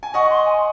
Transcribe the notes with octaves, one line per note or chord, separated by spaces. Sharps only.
G#5
D#5 F#5 C#6
C6
G#5